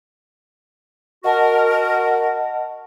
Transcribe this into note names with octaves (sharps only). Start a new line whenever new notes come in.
F#4 A#4 D#5 F#5 A5